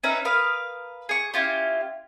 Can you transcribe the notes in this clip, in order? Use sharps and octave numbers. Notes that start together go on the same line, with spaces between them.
C#4 D#4 B4 E5
A#4 B4 F5 D#6
G#4 C#6
C#4 E4 F4 G4